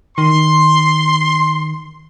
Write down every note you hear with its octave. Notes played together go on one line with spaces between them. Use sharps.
D#3 C6